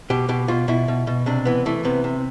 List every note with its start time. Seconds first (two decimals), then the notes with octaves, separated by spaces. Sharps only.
0.10 B2 G4
0.29 B2 G4
0.48 B2 F4
0.68 B2 E4
0.88 B2
1.07 B2
1.26 C3 D4
1.45 E3 B3
1.66 E3 A3
1.85 C3 B3
2.04 C3